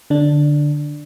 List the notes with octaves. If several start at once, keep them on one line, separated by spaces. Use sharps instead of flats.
D3 D4